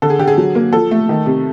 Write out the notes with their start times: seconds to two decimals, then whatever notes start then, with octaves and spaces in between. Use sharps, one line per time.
0.02 D3 A4
0.10 G#4
0.19 D3 G4
0.28 G#4
0.38 F#3
0.55 A#3
0.73 F3 A4
0.91 A3
1.09 D#3
1.26 C3